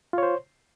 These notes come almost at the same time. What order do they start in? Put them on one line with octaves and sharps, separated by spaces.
F4 C#5 C5